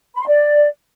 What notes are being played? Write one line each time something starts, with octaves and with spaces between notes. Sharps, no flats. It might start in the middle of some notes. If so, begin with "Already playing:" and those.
B5
C6
D5